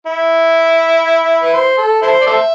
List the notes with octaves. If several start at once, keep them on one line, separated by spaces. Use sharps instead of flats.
E4
B4
C5
A4
E4 A4 C5
D5
A4 C5 E5